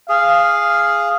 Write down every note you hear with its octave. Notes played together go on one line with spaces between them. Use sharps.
G#4 F5